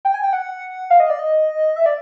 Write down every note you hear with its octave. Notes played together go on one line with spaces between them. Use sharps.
G5
G#5
G5
F#5
F5
D#5
D5
D#5
E5
D5